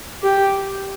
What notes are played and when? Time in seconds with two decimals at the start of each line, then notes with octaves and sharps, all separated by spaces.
0.23 G4